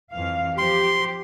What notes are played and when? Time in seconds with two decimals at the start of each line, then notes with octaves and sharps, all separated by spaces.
0.13 F2 E3 F5
0.58 F3 G4 C5 C6